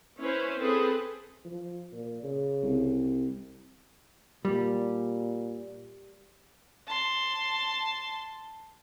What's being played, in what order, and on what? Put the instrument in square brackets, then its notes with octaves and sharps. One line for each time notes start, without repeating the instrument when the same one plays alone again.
[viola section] C#4 E4 B4 C5
C4 G#4 A4 B4 C5
[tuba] F3
A#2
C#3
[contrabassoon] C2
[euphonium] A#2 [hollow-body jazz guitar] G3
[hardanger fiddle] A5 C6